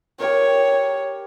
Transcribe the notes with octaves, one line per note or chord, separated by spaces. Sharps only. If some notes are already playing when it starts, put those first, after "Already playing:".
G4 A#4 C#5